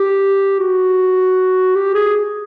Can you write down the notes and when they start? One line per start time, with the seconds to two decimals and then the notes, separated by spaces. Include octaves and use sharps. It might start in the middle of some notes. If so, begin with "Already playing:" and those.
Already playing: G4
0.60 F#4
1.75 G4
1.95 G#4